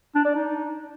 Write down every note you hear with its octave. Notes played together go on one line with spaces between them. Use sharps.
D4
D5
D#4